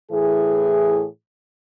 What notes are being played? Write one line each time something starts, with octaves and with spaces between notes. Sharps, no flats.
A2 E3 G#4